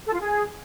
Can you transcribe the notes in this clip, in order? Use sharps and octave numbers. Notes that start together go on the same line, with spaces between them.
A4
F4
G#4